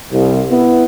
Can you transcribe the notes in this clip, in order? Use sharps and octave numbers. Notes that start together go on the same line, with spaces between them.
C2
B3 E4